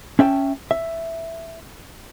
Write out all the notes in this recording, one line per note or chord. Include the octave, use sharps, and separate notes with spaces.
C#4 E5 G5 A5
E5